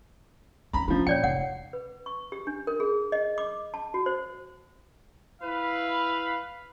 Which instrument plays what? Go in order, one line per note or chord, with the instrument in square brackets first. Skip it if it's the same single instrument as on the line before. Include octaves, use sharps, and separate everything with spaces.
[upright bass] G#1 D#3 [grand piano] A#5 B5
[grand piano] C#3 F3 [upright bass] A3 D4
[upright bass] A#2 [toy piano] C#5 D5 G5 [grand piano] C#7
[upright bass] F1 [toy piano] F#5
[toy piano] B4
C#6
G4
D4
A#4
G#4
D#5
D6
A5
F#4
C5
[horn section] E4 B4 F5